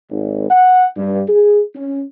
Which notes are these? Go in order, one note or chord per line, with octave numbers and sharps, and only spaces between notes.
G#1
F#5
G2
G#4
C#4